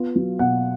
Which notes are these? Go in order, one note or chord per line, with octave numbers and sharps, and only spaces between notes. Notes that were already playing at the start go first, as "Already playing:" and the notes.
Already playing: B3 F4
F#3
B2 F#5